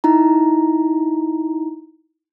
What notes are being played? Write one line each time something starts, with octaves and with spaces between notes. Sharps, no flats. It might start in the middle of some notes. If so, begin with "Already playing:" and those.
D#4 E4 A#5